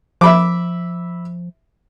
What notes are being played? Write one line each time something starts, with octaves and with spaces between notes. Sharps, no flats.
F3 E5 B5 D6